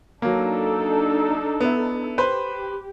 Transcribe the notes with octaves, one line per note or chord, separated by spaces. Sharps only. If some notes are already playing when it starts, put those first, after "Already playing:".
F#3 A#3 D4 D#4 A4
B3 E4
G4 B4 C5 B5